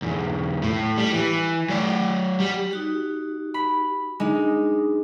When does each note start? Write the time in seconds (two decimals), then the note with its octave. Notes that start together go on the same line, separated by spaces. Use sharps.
0.02 B1 E2
0.63 A2
0.97 G3
1.13 E3
1.69 F#3 D5
2.40 G3
2.71 D#4 F#4 G4
3.54 B5
4.20 G#3 D4 D#4